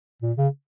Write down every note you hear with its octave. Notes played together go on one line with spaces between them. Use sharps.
A#2
C#3